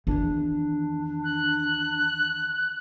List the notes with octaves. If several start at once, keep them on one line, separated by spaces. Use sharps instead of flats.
E2 D#3 D4
F#6